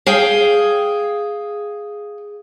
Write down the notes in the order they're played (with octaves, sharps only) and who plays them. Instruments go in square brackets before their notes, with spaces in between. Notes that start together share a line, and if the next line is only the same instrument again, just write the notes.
[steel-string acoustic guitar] G#4 F5 G5